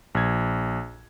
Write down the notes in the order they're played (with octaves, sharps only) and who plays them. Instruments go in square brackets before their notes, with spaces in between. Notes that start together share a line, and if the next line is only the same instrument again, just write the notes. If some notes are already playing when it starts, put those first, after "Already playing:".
[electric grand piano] A#1 G#6